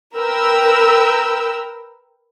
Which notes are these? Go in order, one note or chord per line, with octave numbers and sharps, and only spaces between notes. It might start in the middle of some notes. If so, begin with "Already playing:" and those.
A#4 B4 G5 E6